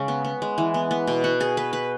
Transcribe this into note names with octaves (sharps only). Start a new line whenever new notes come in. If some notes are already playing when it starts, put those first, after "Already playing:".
Already playing: C#3 G#3 C#4
B3
B3
G#3
E3
B3
B3
B2
F#4
G#4
B4
B4